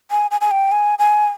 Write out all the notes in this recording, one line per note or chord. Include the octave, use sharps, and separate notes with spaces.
G#5
G#5
G#5
G5
G#5
G#5